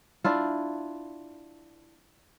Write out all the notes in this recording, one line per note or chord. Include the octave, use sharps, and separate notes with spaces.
D4 E4 F4